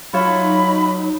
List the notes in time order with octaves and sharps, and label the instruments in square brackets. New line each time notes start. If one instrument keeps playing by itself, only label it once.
[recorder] F#3 [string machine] D#4 [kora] F4 C#5 E5 [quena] B5